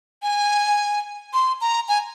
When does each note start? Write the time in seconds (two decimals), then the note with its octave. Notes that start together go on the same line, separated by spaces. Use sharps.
0.23 G#5
1.33 C6
1.61 A#5
1.89 G#5